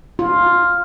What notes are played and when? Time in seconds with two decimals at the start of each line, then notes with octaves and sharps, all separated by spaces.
0.19 F4